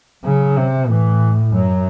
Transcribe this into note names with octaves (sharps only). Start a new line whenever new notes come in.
C#3 F#3
C3
A2 E3
F#2 F#3